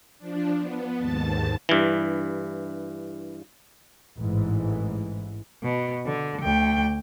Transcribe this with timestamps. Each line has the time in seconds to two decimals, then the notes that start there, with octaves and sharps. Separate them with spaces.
0.18 F3 D4
0.58 B3
0.99 D#2 G#2 A5 A6
1.69 G2 E3
4.19 A1 G#2 E3
5.63 B2
6.06 D3
6.42 D2 G5